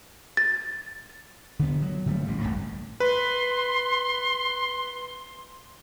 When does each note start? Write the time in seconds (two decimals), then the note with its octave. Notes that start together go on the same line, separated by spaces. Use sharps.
0.37 A6
1.59 D3 B3
1.82 F#3
2.06 A2 D3 G3 A3
2.28 A1
2.41 F#1 C#2 G2 A3
3.00 B4 C6